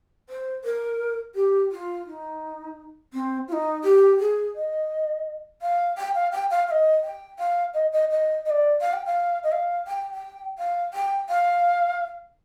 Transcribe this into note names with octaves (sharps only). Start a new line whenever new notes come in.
C5
A#4
G4
F4
D#4
C4
F4
D#4
G4
G#4
D#5
F5
G5
F5
G5
F5
F5
D#5
G5
F5
D#5
D#5
D#5
D#5
D5
F5
G5
F5
D#5
F5
G5
G5
F5
G5
F5